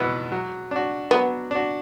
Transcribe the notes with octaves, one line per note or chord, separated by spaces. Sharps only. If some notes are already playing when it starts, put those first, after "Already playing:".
Already playing: E2 B2 B3 E4 B4
F#3
D4 F#4
F#3 B3
D4 F#4